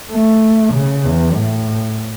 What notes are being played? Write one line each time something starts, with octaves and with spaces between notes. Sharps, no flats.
A3
C#3
E2
A2